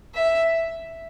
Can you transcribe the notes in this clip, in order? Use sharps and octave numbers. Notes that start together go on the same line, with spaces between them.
E5